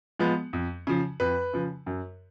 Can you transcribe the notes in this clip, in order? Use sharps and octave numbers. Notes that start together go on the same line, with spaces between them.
F3 G#3 B3
F2
C#3 F3
F2 B4
C#3 F3
F#2